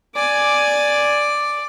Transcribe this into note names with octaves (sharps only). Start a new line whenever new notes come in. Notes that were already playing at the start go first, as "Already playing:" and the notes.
D5 G#5 D6